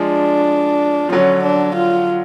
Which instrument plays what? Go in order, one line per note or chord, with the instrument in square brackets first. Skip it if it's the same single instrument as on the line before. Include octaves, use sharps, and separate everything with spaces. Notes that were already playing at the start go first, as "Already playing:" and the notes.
Already playing: [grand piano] F3 G#3 [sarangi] D4
[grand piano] F3
[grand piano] D3 F#3 [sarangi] C#4
[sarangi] D4
F4